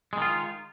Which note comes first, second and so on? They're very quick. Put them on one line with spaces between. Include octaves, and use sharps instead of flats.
G#3 D#3 F4 D#4